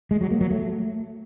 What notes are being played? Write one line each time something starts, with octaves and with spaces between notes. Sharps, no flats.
G#3
F#3
A#3
F#3
A3